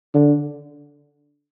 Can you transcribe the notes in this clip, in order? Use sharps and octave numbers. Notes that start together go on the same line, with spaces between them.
D3